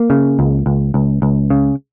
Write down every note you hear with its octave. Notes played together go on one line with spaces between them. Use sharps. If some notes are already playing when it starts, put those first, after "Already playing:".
Already playing: A#3
C#3
C#2
C#2
C#2
C#2
C#3